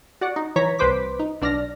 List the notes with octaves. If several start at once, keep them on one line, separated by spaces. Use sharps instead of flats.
F#4 D5 F#5
D#4
E3 C#5 A#5 B6
C2 B4 C5 D6 B6
D#4
B1 D4 D5 F6 A#6